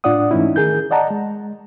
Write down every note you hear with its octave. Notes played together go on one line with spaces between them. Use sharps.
A2 D4 F4 D5 F#5 D#6
G#2 E3 A3 C#4 D#4 E4
D#3 G#4 A#4 G6
D5 D#5 F#5 A5 A#5
G#3